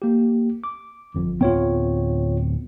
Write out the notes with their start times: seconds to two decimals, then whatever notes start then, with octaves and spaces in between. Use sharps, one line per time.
0.02 A#3 G4
0.64 D6
1.15 G1 F2
1.41 D1 B3 C4 F4 C#5 G5